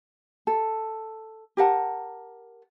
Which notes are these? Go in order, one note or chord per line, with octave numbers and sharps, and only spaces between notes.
A4
G4 A#4 F#5 A5